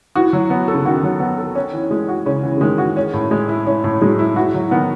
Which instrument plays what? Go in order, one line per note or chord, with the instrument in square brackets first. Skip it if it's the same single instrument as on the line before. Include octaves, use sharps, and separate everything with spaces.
[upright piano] E3 [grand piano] F#4
[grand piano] F#3
B3
A4
[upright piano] C#3
[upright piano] D#3 [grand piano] F#4
[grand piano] F#3
B3
A4
C#4
E3
G#3
F#4
[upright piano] C#3 [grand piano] C#4
[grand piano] E3
[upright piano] C#3
[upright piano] D#3 [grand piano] G#3
[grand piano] F#4
C#4
A2
G#3
E4
[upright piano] E3 [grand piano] C#4
[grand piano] A2
[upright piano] F#3 [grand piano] G#3
[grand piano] E4
[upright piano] E3 [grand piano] F#4
[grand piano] F#3
[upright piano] D#3 [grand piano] B3